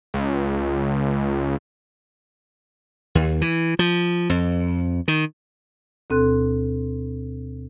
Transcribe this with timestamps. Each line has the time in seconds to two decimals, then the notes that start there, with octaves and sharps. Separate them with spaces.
0.14 C#2
3.15 D#2
3.42 E3
3.79 F3
4.30 F2
5.08 D#3
6.10 D2 B2 C4 A4 C6 F#6